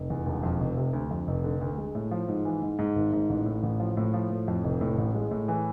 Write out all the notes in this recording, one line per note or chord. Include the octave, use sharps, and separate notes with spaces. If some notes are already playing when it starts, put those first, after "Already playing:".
Already playing: F1
E2
E1
F2
F1
C3
D2
F2
F1
D3
D2
G#3
A2
F3
G#2
E3
G#2
G#2
G#1
G#2
A1
A2
A1
F3
A2
F3
A2
F2
F1
A2
A1
G#3
A2
E3